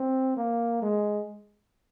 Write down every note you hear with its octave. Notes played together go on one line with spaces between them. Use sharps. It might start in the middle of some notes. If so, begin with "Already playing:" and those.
Already playing: C4
A#3
G#3